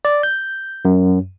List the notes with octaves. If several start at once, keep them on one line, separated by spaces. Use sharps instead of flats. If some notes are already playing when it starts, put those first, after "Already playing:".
D5
G6
F#2